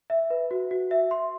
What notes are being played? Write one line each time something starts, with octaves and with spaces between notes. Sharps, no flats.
E5
B4
F#4
F#4
E5
C6